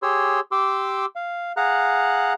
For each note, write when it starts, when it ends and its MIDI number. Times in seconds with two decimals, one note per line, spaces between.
0.03 0.40 67
0.03 0.40 68
0.03 0.40 73
0.03 0.40 84
0.03 0.40 88
0.52 1.06 67
0.52 1.06 84
0.52 1.06 86
0.52 1.06 88
1.16 1.52 77
1.57 2.33 68
1.57 2.33 77
1.57 2.33 78
1.57 2.33 82
1.57 2.33 90